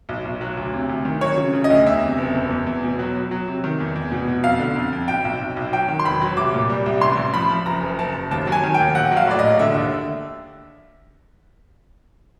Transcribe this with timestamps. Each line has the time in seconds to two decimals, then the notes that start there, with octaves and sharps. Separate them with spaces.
0.09 B1
0.25 B1
0.41 F#3
0.57 D2
0.74 C3
0.89 D2
1.05 D#3
1.21 F#3 C#5
1.38 C#3
1.53 C#3
1.64 D#5
1.70 D2
1.86 E2 E5
2.03 C3
2.18 F#1
2.35 E2
2.50 E2
2.66 E2
2.83 B2
2.99 F#3
3.15 F#3
3.31 F#3
3.48 C3
3.64 D#3
3.80 E2
3.95 E2
4.12 B2
4.28 B2
4.43 F2 F5
4.59 D3
4.76 F2
4.92 F2
5.08 B1 G5
5.25 B1
5.41 B1
5.56 B1
5.73 F#3 G5
5.88 D#3
5.99 C6
6.05 E1 B5
6.21 F#3
6.37 C2 D6
6.54 A#2
6.70 G3
6.86 C2
7.01 A1 C6
7.17 A1
7.34 F3 B5
7.50 F3
7.66 F#1 A#5
7.83 F#1
7.99 F#1 A5
8.14 F#1
8.31 D#2 A5
8.47 F#3
8.52 G#5
8.63 D#3
8.74 G5
8.80 D#2
8.95 A#1 F#5
9.11 F#3
9.17 F5
9.27 A2 D5
9.39 A#1 D#5
9.59 D3 E5
9.75 D#2